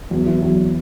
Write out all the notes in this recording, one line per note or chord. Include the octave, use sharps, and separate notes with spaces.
E2 F#3
E3
E2 F#3